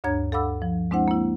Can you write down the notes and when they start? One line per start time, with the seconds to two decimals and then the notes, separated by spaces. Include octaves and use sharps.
0.04 D2 G2 D4 C#5 A#5 G#6
0.32 A4 F5 F#5 B5 D6 E6
0.62 F3
0.91 G#3 C4 D4 E4 C5 F#5
1.08 A#3 E4